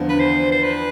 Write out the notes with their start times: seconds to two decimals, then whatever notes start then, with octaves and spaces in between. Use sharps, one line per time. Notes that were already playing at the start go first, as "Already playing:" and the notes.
Already playing: E2 D3 F3 B3 D4
0.09 B4
0.20 C5
0.52 C5
0.63 B4